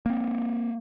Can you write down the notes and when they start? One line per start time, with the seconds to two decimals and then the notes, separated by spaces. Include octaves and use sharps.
0.06 A#3 C4